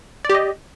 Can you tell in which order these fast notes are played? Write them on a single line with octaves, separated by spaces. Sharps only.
D5 G4 D#5